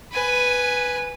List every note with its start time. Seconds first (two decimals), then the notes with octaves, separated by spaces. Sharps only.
0.12 B4 G#5